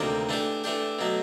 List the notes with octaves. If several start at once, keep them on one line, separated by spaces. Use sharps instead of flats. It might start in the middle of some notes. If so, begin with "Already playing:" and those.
Already playing: D2 C3 D#3 G3 A#3
E3 A3 D4 G4
E3 A3 D4 G4
B2 F#3 A3